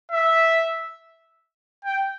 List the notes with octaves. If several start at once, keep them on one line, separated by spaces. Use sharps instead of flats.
E5
G5